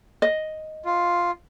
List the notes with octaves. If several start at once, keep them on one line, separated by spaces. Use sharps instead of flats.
D#5
F4